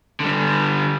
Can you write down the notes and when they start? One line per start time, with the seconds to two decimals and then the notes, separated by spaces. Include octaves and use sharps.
0.20 D3 G3